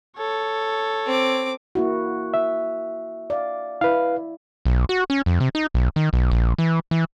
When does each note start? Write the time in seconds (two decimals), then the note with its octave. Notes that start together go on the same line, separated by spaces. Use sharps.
0.17 A4 C#5
1.06 C4 D6
1.75 A#3 E4 F#4
2.34 E5
3.30 D5 F5
3.81 E4 B4 F5
4.65 B1
4.89 F#4
5.10 C#4
5.26 F2
5.40 C3
5.55 D#4
5.74 B1
5.96 D#3
6.13 B1
6.32 A#1
6.59 E3
6.91 E3